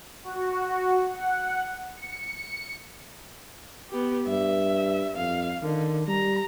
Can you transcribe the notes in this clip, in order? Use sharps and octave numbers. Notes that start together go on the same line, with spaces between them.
F#4
F#5
C#7
B3 G4
G2 E5
F2 F5
D3 D#3
G3 A#5